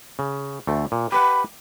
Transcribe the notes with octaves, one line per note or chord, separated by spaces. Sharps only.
C#3
D2 A3
A#2
G4 B4 F#5 B5